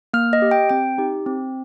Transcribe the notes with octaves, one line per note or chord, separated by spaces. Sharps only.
A#3 F6
D#5
G4
G5
C4 G5
D#4 G4
C4